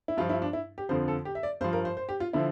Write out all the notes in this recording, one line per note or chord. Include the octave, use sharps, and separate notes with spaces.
E4
G2 F3 F4
E4
D4
E4
G4
F2 D3 F3 C5
A4
G4
E5
D5
G2 F3 C5
A#4
C5
C5
G4
F4
D3 F3 E4